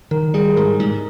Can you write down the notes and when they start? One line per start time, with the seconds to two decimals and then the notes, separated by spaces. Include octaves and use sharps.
0.11 D#3 A#4
0.34 G3 G#4
0.57 G#2 A#4
0.79 G#2